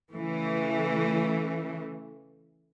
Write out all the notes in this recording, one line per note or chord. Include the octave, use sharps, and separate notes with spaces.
C#3 E3 A3